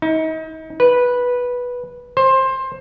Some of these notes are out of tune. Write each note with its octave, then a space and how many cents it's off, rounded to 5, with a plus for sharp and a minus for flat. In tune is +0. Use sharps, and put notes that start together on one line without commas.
D#4 +35
B4 -10
C5 +20